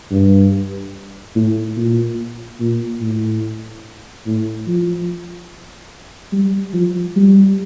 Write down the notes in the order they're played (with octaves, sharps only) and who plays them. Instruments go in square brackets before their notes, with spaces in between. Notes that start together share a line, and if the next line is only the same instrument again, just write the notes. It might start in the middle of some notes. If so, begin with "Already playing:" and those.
[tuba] G2
A2
A#2
A#2
A2
A2
F3
G3
F3
G3